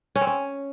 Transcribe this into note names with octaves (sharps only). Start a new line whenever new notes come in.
C#4
C4
C#4